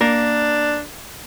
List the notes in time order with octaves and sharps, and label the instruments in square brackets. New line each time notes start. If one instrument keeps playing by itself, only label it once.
[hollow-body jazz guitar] A#3 A#4 [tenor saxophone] D4